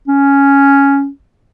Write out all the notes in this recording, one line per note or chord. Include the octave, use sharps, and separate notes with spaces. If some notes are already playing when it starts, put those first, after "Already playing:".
C#4